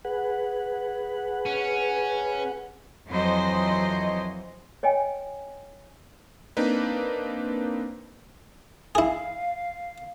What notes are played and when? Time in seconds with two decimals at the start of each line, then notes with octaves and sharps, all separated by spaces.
0.05 G#4 B4 F#5
1.46 C#4
3.08 F2 E3 F#3 C5 D#5
4.83 C#5 D#5 G5 G#5
6.57 A#3 C4 D4 D#4 B4
8.95 E4 G#4 F5